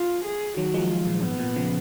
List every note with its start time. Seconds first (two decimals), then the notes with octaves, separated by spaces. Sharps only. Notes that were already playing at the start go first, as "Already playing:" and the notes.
Already playing: F4
0.25 G#4
0.57 D#3 F#3 F#4
0.74 F3 G#3
0.91 F4
1.07 A#2
1.22 G#2 B3
1.39 A#2
1.56 C#3 F3